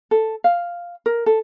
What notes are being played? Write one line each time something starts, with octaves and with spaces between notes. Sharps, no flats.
A4
F5
A#4
A4